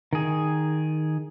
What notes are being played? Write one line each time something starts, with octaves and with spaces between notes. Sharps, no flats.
D#3 G#4